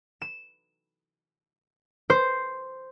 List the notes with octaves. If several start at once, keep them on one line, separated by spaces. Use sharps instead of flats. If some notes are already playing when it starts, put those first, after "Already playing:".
E7
C5